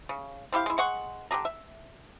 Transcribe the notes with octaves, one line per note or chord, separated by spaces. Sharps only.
C#3
C4 E4 G4 F5
G#3 E4
G#3 F#5 C#6
D3 G4 G#4 A#5
E5